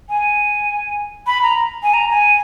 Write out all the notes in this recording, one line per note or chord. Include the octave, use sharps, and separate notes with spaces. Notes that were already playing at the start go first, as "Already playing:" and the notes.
G#5
B5
A#5
G#5
A#5
G#5